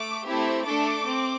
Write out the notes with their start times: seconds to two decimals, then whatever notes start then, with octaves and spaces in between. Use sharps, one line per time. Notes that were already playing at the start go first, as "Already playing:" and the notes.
Already playing: A3 D6
0.25 A3 C4 E4 G4
0.65 A3 D4 A4 D6
1.06 C4